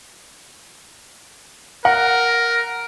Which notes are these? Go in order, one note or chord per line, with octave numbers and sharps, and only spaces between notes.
A#4 F#5